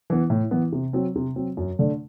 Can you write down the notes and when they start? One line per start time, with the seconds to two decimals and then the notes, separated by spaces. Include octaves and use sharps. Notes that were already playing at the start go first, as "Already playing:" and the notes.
0.10 E3 B3
0.30 A2
0.51 E3 B3
0.72 C3
0.93 F#3 C4
1.16 C3
1.36 F#3 C4
1.57 F#2
1.79 D3 A3 D4